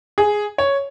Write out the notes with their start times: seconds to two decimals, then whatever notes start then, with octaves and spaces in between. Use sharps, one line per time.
0.18 G#4
0.58 C#5